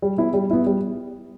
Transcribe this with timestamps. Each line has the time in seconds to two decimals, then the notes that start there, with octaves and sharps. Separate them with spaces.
0.02 G3
0.17 B3 E4
0.34 G3
0.51 B3 E4
0.66 G3